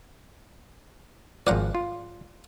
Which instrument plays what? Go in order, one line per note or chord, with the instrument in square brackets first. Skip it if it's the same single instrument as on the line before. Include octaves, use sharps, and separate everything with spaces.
[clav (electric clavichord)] G#1 F3 [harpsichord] D5 F#5 A#5
[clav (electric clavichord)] F4